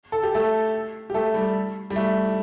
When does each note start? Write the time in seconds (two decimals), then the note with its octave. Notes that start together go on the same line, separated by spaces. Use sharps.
0.12 A4
0.23 G4
0.34 A3 A4
1.10 G4
1.14 A3 A4
1.34 G3
1.90 G3
1.96 A3